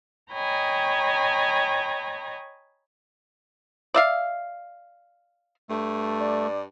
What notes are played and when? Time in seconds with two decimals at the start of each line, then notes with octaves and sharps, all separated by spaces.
0.32 C#5 D#5 G5 G#5 A#5 B5
3.94 D5 E5 F5
5.70 G2 A3
6.20 D5